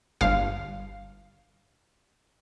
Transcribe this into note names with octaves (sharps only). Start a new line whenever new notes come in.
G1 G2 F5